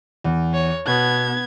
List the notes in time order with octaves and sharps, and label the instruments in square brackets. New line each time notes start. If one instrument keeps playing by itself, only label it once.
[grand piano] E2
[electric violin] C#5
[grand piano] B2 [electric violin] B3 G#6